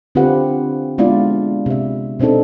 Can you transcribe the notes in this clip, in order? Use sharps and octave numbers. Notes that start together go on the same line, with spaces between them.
D3 C4 F4 G4 B4 F#5
G#3 B3 D4 E4 F4 D5
C3 E5
B2 C4 D4 D#4 A4